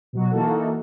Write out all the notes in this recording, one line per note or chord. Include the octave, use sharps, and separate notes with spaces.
B2 F#3 F#4
E3 A#3 D#4 F#4 A4